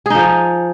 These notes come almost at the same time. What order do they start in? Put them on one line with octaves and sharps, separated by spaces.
G#4 D#4 F3